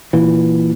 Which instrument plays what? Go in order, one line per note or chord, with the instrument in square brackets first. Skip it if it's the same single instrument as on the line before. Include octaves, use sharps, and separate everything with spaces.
[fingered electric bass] A#2 E3